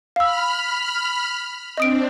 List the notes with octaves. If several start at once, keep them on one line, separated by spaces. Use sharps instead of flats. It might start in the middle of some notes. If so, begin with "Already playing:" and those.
F5 B5 E6 F6
C4 D4 D#5 D#6 D7